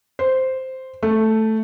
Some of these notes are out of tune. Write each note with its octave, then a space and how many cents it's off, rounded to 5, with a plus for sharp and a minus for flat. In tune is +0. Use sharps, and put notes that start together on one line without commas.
C5 -5
A3 +0